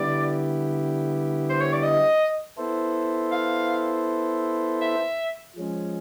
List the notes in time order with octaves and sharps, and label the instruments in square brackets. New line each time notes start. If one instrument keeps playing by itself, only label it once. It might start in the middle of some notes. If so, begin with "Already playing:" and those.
Already playing: [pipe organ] D3 G3 B3 E4 G4 [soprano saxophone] D5
[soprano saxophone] C5
C#5
D5
D#5
[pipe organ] B3 E4 A4 C5
[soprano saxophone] F5
E5
[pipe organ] F3 G#3 C#4